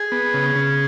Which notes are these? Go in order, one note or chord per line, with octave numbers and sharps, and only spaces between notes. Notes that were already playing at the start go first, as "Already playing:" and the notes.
Already playing: G#4
B3
C#3
C#3